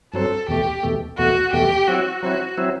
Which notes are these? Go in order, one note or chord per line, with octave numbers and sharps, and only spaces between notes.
G2 F#3 C4 A4
E2 B2 A3 G4
E2 B2 A3
E2 B2 A3 F#4
E2 B2 A3 G4
F#3 C4 E4 F#4
F#3 C4 E4 F#4
F#3 C4 E4